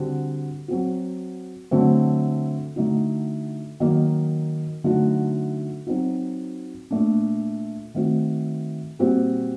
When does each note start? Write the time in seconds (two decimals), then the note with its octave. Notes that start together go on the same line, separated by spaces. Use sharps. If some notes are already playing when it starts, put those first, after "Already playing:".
Already playing: D3 G3 C4 F#4
0.68 F#3 C4 F#4
1.71 D3 F#3 A3 C4
2.76 D3 A3 D#4 F#4
3.80 D#3 F#3 A#3 D#4
4.84 D3 F#3 A3 D#4 F#4
5.87 F#3 C4 D#4 F#4
6.91 A#2 A3 D4
7.95 D#3 A3 C4 F#4
8.99 A#2 G3 C4 F#4